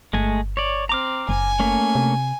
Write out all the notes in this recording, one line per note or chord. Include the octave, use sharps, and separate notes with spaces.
G1 G#3 A3 G#5
C#5 D5
C4 A#5 D6 F6
F#1 G#5
A3 A#3 C#4
C3